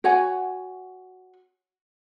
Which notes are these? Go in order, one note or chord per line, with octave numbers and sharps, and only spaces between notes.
F#4 C#5 F#5 G#5